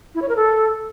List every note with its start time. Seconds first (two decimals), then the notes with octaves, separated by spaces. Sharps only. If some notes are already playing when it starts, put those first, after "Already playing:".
0.15 E4
0.22 C#5
0.29 A#4
0.36 A4